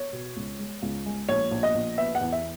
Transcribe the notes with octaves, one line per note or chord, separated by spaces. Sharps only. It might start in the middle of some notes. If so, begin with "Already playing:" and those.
Already playing: C#5
B2
C#2
G#3
C#2
G#3
A#1 C#5
A#1
D#5
A#1
B3 E5
F#5
E2
E5